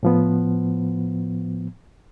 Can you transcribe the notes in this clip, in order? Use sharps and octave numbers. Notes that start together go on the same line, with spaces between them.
A2 F3 B3